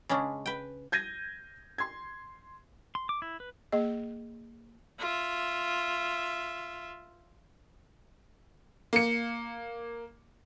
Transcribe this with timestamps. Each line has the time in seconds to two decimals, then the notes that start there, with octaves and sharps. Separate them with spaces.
0.09 C#3 G#3 C#4 D4
0.46 B4 G5
0.92 G6 G#6 A#6 D#7
1.78 C6 G#6
2.95 C6
3.09 D6
3.22 E4
3.40 B4
3.72 A#3 G#4 D#5
4.99 F4 E5
8.93 A#3 C#7